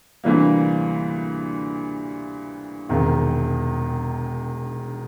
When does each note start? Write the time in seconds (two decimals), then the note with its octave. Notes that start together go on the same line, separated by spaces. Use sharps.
0.24 D2 C3 E3 G3 A#3
2.89 E1 E2 C3 D#3